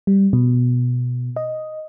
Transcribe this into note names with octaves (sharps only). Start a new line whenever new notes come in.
G3
B2
D#5